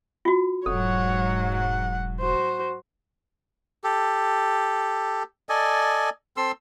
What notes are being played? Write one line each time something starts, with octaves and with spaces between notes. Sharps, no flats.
F4 F#4
E1 G#2 F#3 A4 C#5 F#5
F#5
F#4 C5
G4 A4
A4 D5 D#5 G#5
C4 A4 C6 E6